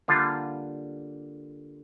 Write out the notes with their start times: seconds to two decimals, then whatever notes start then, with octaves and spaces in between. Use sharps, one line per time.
0.08 D3 G3 A#3 D4 F4